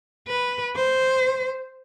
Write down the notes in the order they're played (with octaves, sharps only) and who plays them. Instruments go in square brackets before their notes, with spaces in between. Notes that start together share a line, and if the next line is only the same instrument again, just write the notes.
[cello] B4
C5